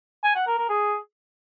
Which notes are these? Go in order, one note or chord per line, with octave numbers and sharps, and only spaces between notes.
G#5
F#5
A#4
A#4
G#4